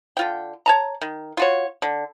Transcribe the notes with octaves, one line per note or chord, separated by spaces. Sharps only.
D3 F4 G5
C#5 A5 A#5
D#3
F4 F#4 C#5
D3